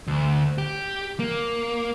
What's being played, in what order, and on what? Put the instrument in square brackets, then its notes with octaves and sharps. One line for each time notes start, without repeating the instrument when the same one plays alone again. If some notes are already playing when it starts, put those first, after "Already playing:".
[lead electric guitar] D2
G4
A#3